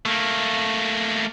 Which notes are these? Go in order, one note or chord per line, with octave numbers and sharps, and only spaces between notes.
A3 A#3